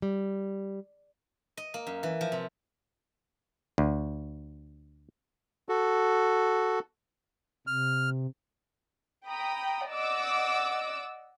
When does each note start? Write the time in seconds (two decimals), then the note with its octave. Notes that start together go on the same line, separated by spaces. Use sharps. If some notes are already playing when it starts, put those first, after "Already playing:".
0.02 G3
1.57 D#5
1.74 A#3
1.87 F#2
2.03 E3
2.21 F3
2.32 C3
3.78 D2
5.69 F#4 A4
7.67 C3 F6
9.27 G5 A#5 B5 D#6
9.88 D5 D#5 F#5 D6 E6